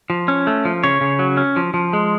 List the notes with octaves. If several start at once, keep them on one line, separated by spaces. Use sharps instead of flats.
F3
C#4
A3
F3
C#3 C#5
C#3
F#3
C#4
F3
F3
G#3